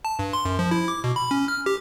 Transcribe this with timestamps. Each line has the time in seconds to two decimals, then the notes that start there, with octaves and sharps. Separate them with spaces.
0.05 A5
0.19 G2
0.33 C6
0.45 F#2
0.59 F3
0.71 E4
0.88 D6
1.04 B2
1.16 B5
1.31 C#4
1.48 F6
1.66 G4